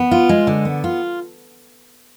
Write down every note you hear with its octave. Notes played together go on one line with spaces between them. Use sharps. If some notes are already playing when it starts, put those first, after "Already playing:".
Already playing: B3
F4
G#3
D3
B3
F4